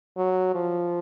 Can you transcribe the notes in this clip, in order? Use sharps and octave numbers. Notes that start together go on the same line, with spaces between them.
F#3
F3